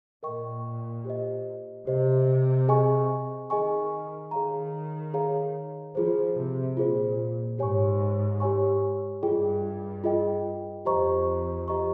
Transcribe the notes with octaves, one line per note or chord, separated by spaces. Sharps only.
A#2 A#4 D#5 G5 C#6
G4 C5 D#5
C3 G4 C5 D#5
G#4 D#5 G#5 C#6
D#3 G#4 D#5 G#5 C#6
D#3 G#4 C#5 F5 A#5
G#4 C#5 F5 A#5
F3 F4 G#4 C5
C3
A#2 F4 G#4 C5
G#2 G4 C#5 G#5 C#6
G4 C#5 G#5 C#6
G2 F4 G#4 D#5 G5
F4 G#4 D#5 G5
F2 G4 C5 D#5 A#5 C#6
G4 C5 D#5 A#5 C#6